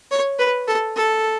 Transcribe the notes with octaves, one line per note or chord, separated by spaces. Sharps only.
C#5
B4
A4
A4